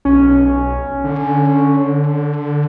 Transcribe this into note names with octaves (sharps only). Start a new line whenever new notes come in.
B1 C#4
D3